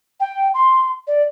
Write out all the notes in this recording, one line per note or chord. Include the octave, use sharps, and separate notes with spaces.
G5
C6
D5